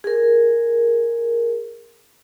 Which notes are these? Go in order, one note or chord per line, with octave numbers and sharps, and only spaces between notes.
G#4 A#4